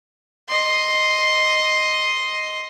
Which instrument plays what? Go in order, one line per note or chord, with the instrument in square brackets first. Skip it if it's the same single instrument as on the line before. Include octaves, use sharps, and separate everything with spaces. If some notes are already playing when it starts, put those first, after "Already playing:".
[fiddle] D#5 C6